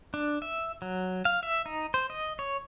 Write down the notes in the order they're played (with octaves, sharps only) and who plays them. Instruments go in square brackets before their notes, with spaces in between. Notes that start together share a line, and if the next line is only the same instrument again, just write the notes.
[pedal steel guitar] D4
E5
F#3
F5
E5
D#4
C5
D#5
C#5